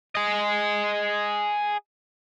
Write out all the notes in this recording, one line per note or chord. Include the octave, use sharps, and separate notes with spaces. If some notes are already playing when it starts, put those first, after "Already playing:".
G#4 D#5